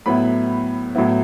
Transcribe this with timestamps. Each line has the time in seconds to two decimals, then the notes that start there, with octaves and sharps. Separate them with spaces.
0.06 A2 F#3 B3 E4 B5
0.95 A2 F#3 B3 E4